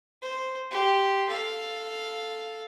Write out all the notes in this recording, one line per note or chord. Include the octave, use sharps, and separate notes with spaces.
C5
G4 C6
A4 F5